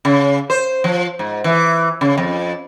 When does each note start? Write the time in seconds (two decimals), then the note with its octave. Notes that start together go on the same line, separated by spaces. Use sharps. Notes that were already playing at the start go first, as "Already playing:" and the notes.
0.05 C#3
0.50 C5
0.84 F3
1.19 G#2
1.44 E3
2.01 C#3
2.18 F2